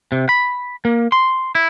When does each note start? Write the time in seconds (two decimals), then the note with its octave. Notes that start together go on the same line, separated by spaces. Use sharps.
0.12 C3
0.29 B5
0.85 A#3
1.12 C6
1.55 E4